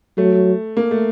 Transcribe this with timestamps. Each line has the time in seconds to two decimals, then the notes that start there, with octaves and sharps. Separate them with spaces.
0.18 F#3 A3
0.77 A#3
0.91 A3